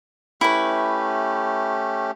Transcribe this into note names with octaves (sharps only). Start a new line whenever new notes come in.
A3 C#4 E4 G4 B4